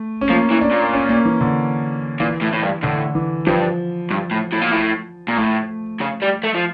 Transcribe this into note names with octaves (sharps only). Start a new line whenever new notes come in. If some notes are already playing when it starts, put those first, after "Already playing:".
Already playing: A3
C#4
F3 A#3
E3
D4
A#2
C#4
A#3
E3
D3
A#2 E3
A2
A2
G2
A2 D3
E3
G2 F3
G2
A2
A2
A#2
A2
A#2
A2 A3
C#3
G3
A3
F3